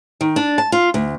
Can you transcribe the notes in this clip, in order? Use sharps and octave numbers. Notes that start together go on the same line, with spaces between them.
D#3
D4
A5
F4
D2